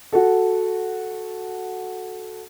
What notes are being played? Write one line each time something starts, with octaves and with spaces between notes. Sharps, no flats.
F#4 A4